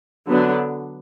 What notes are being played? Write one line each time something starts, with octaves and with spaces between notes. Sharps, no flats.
D3 F#3 B3 D4